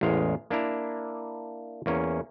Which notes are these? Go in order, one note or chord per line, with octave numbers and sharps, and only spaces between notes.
A1 E2 G#3 F5
A#3 D4 E4 A#5
E2 A#3 C#4